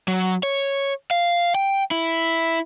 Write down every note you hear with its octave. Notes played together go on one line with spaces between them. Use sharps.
F#3
C#5
F5
G5
E4